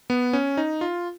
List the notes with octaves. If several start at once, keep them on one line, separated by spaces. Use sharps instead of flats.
B3
C#4
D#4
F4